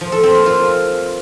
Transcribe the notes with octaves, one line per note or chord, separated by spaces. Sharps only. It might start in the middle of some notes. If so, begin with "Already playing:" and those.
F3
A4
C4
A#3
F4